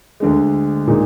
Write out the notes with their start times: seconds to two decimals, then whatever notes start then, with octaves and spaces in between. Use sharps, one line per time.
0.20 D2 D3 G#3
0.87 A#2 G#3 D#4